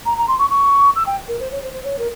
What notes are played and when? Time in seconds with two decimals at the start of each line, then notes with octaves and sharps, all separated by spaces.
0.05 A#5
0.17 A#5
0.27 C6
0.39 C#6
0.50 C#6
0.95 E6
1.06 G5
1.28 A#4
1.40 C5
1.51 C#5
1.62 C5
1.73 C5
1.84 C#5
1.98 A#4